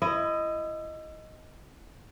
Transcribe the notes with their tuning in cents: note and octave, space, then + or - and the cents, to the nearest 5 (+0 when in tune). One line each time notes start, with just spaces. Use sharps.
E4 +30 D#5 +5